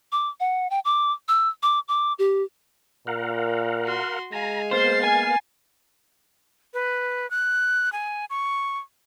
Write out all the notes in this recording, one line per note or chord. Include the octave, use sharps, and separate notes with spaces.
D6
F#5
G5
D6
E6
D6
D6
G4
A#2 A#4 F5 F#5
F#4 C6
G#3 F5 G#5 A#5
A#3 B3 C5 F5 A6 C7
G#5
B4
F#6
G#5
C#6